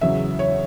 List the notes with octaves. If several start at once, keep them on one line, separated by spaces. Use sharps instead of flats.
E2 C#3 F#3 E5
C#5